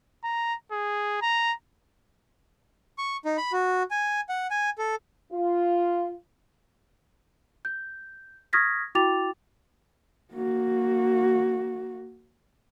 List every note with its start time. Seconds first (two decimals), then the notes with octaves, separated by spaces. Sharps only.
0.24 A#5
0.72 G#4
1.22 A#5
2.98 C#6
3.25 D#4
3.38 B5
3.52 F#4
3.91 G#5
4.29 F#5
4.51 G#5
4.78 A4
5.32 F4
7.65 G6
8.53 C#6 D#6 F6 G#6 A#6 B6
8.95 E4 F#4 G5 D6 A6 F7
10.33 A#3 F#4